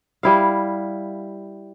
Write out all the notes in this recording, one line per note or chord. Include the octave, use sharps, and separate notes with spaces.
G3 E4 F5